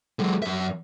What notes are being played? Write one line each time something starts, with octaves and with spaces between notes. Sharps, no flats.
F#3 G#3
F#2 E5